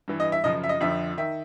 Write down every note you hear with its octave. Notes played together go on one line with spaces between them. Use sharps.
G2 E3
D#5
E5
F#2 C#3 F3 D#5
E5
D#5
F2 D3 F3 E5
D#3 E5